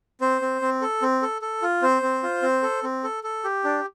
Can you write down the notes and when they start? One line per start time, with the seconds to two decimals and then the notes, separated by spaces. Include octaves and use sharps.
0.21 C4 C5
0.42 C4
0.62 C4
0.81 A4
1.02 C4
1.22 A4
1.42 A4
1.62 F4
1.82 C4 C5
2.02 C4
2.23 F4
2.43 C4
2.62 A4
2.83 C4
3.04 A4
3.24 A4
3.44 G4
3.64 D4